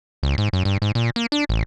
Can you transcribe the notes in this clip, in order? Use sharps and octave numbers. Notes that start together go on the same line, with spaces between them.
C#2
G#2
F#2
G2
G#2
A#2
A#3
D4
A1